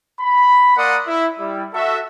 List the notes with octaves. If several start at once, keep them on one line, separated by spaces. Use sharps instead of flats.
B5
A#3 A#4 D5 F#5 C6 D#6
E4
G3 E4
F#4 A4 E5